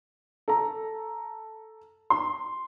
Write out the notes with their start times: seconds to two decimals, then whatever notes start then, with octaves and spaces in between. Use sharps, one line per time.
0.48 A4 A#5
2.10 C6